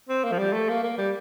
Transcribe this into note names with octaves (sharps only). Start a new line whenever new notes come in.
C4
A#3
F3
G3
A3
A#3
A#3
G3